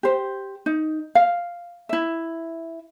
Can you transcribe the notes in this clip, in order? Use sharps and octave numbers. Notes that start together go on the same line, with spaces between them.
G4 C5
D#4
F5
E4 E5